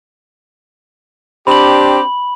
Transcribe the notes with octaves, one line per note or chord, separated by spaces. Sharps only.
C4 D4 G4 B5 F#7